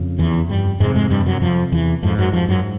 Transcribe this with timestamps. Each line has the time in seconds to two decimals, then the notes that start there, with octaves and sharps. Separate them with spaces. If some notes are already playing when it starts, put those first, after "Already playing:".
Already playing: F2 C#3
0.19 E2 E3
0.49 G2 G3
0.80 F2 G#2 C3 G#3
0.95 G#2 G#3
1.10 G2 G3
1.26 F#2 F#3
1.41 F2 F3
1.72 E2 E3
2.03 F2 G#2 F3
2.18 F#2 F#3
2.33 F2 F3
2.48 F#2 F#3